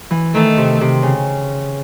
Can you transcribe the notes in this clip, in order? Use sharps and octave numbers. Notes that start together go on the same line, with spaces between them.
E3
D#3 A3
C3
C3
C#3